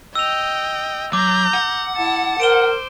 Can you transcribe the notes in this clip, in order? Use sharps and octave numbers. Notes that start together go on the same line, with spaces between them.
D#5 G5 E6 F7
F#3 A#5 D6 G6
F#5
E4 A5
A#4 C5 D7 E7 G7